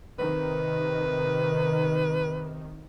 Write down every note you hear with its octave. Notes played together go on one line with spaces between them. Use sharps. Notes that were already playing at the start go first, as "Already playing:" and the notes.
C3 D#3 B4